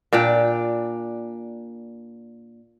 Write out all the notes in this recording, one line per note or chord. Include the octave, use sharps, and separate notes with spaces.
A#2 D4 D5 G5